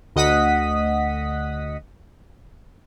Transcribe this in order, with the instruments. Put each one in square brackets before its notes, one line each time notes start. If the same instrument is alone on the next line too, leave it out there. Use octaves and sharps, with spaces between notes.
[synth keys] D2 D#5 F#5 D#6 B6